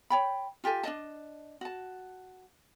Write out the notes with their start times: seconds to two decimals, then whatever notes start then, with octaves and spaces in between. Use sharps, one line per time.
0.10 C#5 G5 B5
0.64 F4 G4 A4 G#5
0.83 D4 A#4 D#5 A5
1.61 F#4 A5